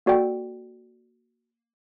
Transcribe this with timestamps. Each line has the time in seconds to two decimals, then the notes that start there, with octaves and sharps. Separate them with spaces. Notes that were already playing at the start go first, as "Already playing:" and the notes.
0.06 A#3 F#4 A4 D5 G5